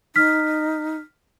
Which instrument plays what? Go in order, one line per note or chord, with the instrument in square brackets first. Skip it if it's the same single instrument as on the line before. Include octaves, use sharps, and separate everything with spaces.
[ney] D#4 [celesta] F6 B6